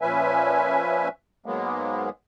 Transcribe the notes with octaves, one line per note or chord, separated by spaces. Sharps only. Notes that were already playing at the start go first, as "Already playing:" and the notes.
A#2 F3 C#4 B4 E5 G#5
G#2 F#3 G#3 A#3 B3